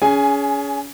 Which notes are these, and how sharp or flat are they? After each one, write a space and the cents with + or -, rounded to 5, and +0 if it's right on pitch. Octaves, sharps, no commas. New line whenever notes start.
C#4 +30 G#4 +10 G#5 +0